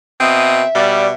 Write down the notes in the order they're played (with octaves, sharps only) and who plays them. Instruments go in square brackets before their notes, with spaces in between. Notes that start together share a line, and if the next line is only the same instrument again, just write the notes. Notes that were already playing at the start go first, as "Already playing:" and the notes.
[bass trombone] B2 [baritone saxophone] C4 [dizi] E5 [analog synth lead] D#6
[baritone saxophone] B2 [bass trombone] G3 [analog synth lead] D5